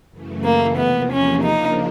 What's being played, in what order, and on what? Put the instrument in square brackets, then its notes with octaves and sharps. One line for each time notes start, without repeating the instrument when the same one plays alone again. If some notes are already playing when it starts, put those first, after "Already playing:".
[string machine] F#2 C#3 E3 A3
[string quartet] A#3
[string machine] E2 C3 F3 A#3 [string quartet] B3
[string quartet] C#4
[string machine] C#3 F3 A#3 D4 [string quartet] D#4